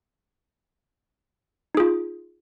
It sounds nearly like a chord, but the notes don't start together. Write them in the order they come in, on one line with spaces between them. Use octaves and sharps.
D#4 G#4 F4